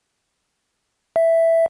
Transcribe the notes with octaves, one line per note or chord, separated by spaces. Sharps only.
E5